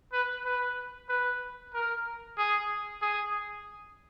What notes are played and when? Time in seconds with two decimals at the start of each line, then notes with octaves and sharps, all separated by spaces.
0.13 B4
0.45 B4
1.09 B4
1.74 A#4
2.37 G#4
3.02 G#4